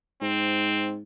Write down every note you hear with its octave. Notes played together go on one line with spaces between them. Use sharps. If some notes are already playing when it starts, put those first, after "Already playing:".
G#2 C4